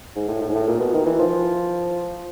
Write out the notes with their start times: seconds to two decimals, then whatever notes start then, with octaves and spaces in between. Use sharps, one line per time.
0.16 G#2
0.28 A2
0.42 A2
0.49 G#2
0.55 A2
0.68 A#2
0.80 B2
0.94 D#3
1.06 E3
1.19 F3